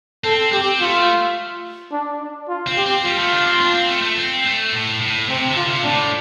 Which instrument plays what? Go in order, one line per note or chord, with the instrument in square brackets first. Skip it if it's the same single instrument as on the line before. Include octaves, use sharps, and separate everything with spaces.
[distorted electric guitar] C4 [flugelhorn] A4
[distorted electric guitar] C4 [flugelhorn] G4
[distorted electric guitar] A3 [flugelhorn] F4
[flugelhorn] D4
D4
F4
[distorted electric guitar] C4
[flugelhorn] G4
[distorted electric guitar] C4
[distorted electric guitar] G3 [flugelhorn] F4
[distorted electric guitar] A3
D4
C4
D4
C4
A3
A3
C4
A3
A2
A2
[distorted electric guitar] C3 [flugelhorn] C4
[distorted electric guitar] D3
[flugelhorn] F4
[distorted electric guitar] C3
[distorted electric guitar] A2 [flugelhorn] D4